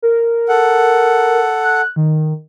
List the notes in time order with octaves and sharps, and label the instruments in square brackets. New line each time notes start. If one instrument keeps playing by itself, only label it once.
[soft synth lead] A#4
[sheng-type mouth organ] A4 F#5
[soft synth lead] F#6
D#3